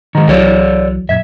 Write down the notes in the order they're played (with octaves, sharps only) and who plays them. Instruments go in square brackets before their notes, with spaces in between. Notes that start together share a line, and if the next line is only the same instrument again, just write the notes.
[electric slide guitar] D#3 G#3 [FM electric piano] A#5
[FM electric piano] C2 E3 F#3 [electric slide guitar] A4 C#5 D5
[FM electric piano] F#2 A#2 G#6 [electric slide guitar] E5